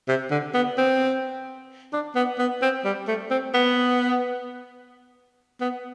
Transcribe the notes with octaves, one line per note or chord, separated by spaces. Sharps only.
C3
D3
B3
C4
D4
B3
B3
C4
G3
A3
C4
B3
B3